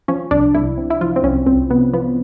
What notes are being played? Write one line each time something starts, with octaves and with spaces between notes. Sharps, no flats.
F3 C#4
C2 D4
C2 E4
C3
E4
F3 F4
C4
C2 C#4
C2 C4
C3 B3
F3 B3